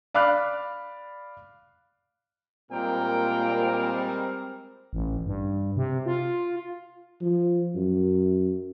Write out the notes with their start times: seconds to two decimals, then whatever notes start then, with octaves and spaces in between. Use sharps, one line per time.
0.14 D5 F5 B5 D6 F6 F#6
2.72 A#2 G3 G#3 C4 A#4 G5
4.93 A1
5.27 G2
5.77 C3
6.06 F4
7.21 F3
7.75 F#2